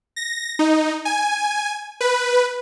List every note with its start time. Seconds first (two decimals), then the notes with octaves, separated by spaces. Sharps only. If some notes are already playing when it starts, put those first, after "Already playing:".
0.16 A#6
0.59 D#4
1.05 G#5
2.01 B4